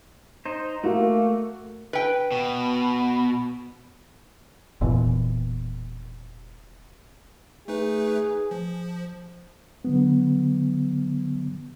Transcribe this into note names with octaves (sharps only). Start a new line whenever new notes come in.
D#4 C5
A3 A#3 F#4
B4 G5
B2
E1 E2 A#2 E3
A3 D#4 G#4 B4
F3
D3 F#3 B3